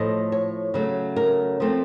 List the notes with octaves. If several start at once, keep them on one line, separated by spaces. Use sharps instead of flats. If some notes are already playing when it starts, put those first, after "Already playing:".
Already playing: A2 F3 A3 D#5
C#5
C#3 F#3 A3
A#4
F3 A3 C4